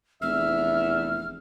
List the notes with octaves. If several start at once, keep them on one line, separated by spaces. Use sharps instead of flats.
F1 E2 E5 F6